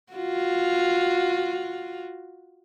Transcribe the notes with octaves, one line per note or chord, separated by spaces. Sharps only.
F4 F#4